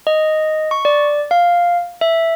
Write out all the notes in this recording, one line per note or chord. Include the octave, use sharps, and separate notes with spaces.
D#5
C#6
D5
F5
E5